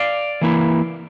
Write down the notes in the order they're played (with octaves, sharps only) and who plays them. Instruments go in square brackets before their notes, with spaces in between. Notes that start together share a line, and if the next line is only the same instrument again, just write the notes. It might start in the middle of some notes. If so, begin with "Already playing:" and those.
Already playing: [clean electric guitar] D5 F5
E3 A#3 E4